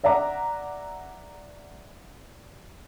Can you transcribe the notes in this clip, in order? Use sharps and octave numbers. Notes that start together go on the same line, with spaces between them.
D5 E5 F#5 A#5 D6